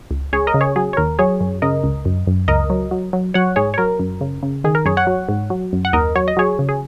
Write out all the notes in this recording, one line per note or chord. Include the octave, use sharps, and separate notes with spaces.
C#2
C#2 G#4 C#5
A#4 D#5
C#3
G#4 C#5
F#3 G#4
C#5
D#2 A#4
F#3 G#4 C#5
F#2
C#3 A#4 D#5
C#2
F#2
F#2
C#2 A#4 D#5
F#3
F#3
F#3
F#3 C#5 F#5
G#2 G#4 C#5
C#5
F#3 A#4
F#2
C#3
C#3
D#3 G#4
A#4
F#2 G#4 C#5
C#5 F#5
F#3
G#2
F#3
F#2
F#5
D#2 A#4 D#5
F#3 C#5
D#5
F#3 G#4 C#5
C#3
G#4